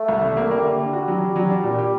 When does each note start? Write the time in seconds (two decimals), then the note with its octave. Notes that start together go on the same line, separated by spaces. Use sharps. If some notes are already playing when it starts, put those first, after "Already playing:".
Already playing: A3
0.08 C2
0.22 G3
0.37 A#3
0.51 G3 A#3
0.65 D3
0.79 D3
0.93 F#4
1.08 F#3
1.21 D4
1.36 F#3
1.50 D4
1.64 A#2
1.79 G4